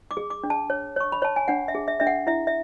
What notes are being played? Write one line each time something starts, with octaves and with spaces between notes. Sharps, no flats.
D6
G#4
D6
D4
A5
C#5
C#5 C#6
B5
C#5 A5
G#5
D4 F#5
E5
G#4
E5
D4 E5
F#5
E4 E5
E5